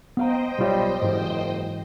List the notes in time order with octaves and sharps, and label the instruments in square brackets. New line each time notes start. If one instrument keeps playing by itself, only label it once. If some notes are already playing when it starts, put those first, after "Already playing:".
[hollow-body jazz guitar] B3 F5 A#5 [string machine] C5 D#5 G5
[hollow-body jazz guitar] B1 F4 C#5 [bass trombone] G3
[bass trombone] F#1 [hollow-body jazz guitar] G#2 E3